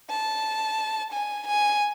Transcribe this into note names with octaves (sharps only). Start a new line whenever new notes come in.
A5
G#5
G#5